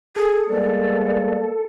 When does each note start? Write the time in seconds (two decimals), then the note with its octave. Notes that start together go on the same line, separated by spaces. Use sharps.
0.16 G#4 A4
0.49 G3 G#3 A#3 B3 D5